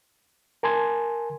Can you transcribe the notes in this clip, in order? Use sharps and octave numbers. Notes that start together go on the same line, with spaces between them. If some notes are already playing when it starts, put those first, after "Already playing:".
A#4 G#5 A5 C6 G#6